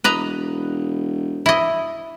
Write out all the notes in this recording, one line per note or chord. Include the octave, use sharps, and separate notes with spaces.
E1 B4 D#5 A#5
E4 D#5